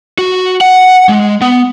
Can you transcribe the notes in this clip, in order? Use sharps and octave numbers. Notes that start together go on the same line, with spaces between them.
F#4
F#5
G#3
B3